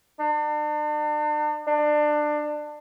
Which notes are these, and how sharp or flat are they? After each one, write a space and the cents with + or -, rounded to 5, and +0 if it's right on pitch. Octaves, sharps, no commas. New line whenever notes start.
D4 +40
D4 +25